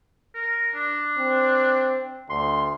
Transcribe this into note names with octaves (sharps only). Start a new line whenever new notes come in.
A#4
D4
C4
D2 C6